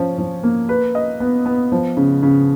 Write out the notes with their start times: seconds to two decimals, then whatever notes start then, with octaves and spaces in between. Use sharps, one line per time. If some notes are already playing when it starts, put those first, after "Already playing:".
Already playing: F3 C#4
0.18 F3
0.43 A#3
0.69 B4
0.95 D#5
1.20 B3
1.46 B3
1.72 F3
1.97 C#3
2.23 C#3